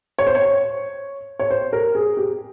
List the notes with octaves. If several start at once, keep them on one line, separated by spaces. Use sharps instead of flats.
C#5
C5
C#5
C#5
C5
A#4
G#4
G4